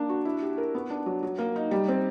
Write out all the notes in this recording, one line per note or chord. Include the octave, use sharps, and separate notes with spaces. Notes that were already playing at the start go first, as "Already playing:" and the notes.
Already playing: A#3 D4
F#4
E4
G4
A#4
B3
D4
F#3
F#3
A#3
D#4
G3
C4